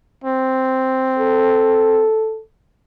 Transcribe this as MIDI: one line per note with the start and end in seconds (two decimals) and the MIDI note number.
0.24 2.07 60
1.19 2.40 69